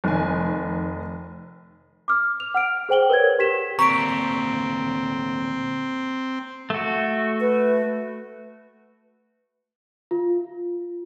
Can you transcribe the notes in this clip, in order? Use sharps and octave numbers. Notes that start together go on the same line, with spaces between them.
F1 D#3 G#5
D6 F6
F7
F#5 F6 D7
G#4 C5 G5 F#7 G7
A#4 B4 C#5 G#6
G4 B6 E7
D2 A#2 C4 A#5 C#6 B6 D7
A3 F#4
B4
F4